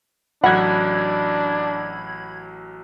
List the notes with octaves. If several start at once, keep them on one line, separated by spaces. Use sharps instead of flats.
A1 F#3 D4 F#5 B5 F#6 G#6